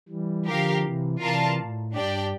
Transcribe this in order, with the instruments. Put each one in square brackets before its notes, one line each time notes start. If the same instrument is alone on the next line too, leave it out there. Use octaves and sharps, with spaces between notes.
[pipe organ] E3 G3
[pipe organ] D3 F3 [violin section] G4 A#4 F5
[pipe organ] C3 E3
[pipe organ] C3 E3 [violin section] F4 A#4 D5 F5 A5
[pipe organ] A2
[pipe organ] G2 [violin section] D4 G4 D5 G5